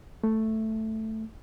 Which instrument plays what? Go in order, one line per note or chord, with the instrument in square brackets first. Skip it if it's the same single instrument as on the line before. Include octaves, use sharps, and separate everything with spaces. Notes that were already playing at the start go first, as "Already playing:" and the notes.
[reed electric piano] A3